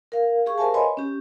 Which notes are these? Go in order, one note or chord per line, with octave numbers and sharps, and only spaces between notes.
A#4 F5
G4 G#4 F5 C#6
A#4 C5 E5 F5 G#5 A5
B4 C#5 D#5 G#5 B5 C6
C#4 G4